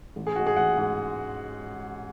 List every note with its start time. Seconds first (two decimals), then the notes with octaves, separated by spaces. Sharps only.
0.16 A1
0.27 G#4
0.36 G#2 G#3 F#4
0.47 G#4
0.57 A1 F#5
0.77 G#2 G#3